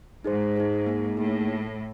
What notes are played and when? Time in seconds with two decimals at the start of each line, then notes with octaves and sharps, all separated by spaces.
0.24 G#2 D#4 G#4 C5
0.56 D#4 G#4 C5
0.86 A#3 D#4 G#4
1.17 A2 A#3 D#4 G#4